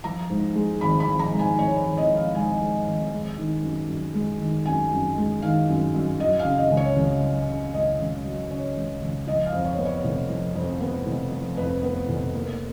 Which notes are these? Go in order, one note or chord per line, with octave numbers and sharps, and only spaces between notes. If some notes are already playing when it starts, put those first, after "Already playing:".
F3 A#5
G#2
G#3
G#1 B5
B5
F3
A#5
G#2
G#5
G#3 C#5
C#5
G#1
D#5
F3
F5
G#2 G#5
G#3
G#1
G#3
D#3
F#2
F#2
G#3
D#3
F#2 G#5
F#2
G#3
D#3 F5
F#2
F#2
F#3 D#5
F5
C#3
D#5
C#2
C#5
C#2
F#3
C#3
C#2 D#5
C#2
F#3
C#3 C#5
C#2
C#2
F3 D#5
F5
F2
C#5
B3
C#5
F1
F3
F2
B3
F1
F3
F2 B4
B3
F1
A#3